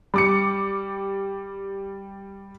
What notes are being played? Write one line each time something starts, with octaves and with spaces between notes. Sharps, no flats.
G3 D6 C#7